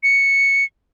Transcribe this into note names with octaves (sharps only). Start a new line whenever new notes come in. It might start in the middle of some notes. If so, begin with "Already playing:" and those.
C#7